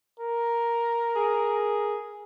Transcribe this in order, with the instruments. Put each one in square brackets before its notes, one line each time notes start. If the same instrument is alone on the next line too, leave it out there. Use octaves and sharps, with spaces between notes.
[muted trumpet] A#4
[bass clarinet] G#4